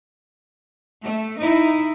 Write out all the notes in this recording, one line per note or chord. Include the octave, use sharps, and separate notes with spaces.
A3
D#4 E4